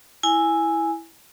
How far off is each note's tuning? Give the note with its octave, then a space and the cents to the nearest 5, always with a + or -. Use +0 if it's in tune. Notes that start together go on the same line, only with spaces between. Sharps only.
E4 +0 G#5 +0